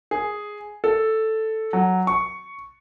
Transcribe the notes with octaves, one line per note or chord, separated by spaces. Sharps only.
G#4
A4
F#3
C#6